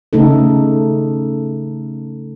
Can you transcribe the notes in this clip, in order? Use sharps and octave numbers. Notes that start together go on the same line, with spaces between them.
C#3 A3 D#4 A4